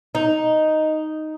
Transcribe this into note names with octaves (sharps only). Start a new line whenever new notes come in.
D#4